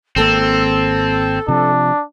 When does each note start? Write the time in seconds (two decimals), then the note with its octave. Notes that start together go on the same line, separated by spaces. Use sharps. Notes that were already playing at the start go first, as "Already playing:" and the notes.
0.16 G#1 A#3 C4 A4
1.48 C3 F3 D4